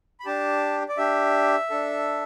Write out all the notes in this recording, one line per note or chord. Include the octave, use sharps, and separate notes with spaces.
B5
D4 G4 A5
D5
D4 G4 E5
D4 A4